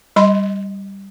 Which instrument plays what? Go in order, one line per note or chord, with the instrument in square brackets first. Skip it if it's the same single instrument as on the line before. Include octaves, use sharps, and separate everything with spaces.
[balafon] G3 D#5 B5 C6